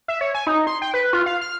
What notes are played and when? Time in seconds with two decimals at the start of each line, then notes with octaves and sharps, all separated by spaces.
0.08 E5
0.21 C#5
0.34 G#5
0.47 D#4
0.67 C6
0.82 G5
0.94 B4
1.13 F4
1.26 F5
1.41 F6